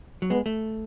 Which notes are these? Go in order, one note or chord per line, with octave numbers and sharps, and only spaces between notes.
F#3
G#3 B3
A3